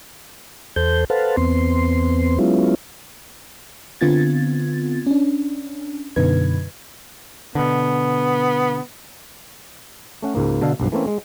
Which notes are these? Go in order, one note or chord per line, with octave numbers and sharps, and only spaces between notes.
E2 A4 C5 G6
A4 B4 C5 F5 F#5 A5
E2 B3 C4 C6
F#3 G#3 B3 C#4 E4 F4
D3 B3 C4 F4 G#6 A6
C#4 D4
F#2 B2 D3 D#4 B4 G#6
B2 D3 B3
A3 C#4 F#5
C#2 G#2 A#3
B2 D3 A4 F5
B1 G2 F3
E3 A3 A#3 C4 C#4
G#3